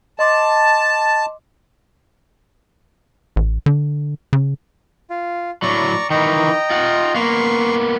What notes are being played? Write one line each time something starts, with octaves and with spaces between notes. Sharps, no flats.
D#5 A5 C6 D6
A1
D3
C#3
F4
A2 F#3 D5 A#5 C#6
D#3 E3 D#5 G5 A#5
F4 F#5
A#3 B3 C6 C#6